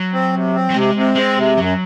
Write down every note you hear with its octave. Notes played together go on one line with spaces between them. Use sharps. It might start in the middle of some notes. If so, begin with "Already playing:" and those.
Already playing: F#3
C4
C3
C4
F#3
C3 G#3
C3
G#3 C4
C3
F#2 F#3